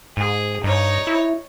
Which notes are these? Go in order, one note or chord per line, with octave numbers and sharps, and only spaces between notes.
G#2 G#4
G2 D#4 C#5
E4